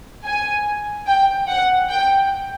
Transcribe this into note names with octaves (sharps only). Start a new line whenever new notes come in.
G#5
G5
F#5
G5